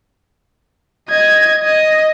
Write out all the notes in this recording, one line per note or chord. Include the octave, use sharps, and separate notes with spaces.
D#5 G#6
D#5